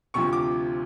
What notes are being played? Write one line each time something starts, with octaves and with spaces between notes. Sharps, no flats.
D2 C3 F3 C#6
D6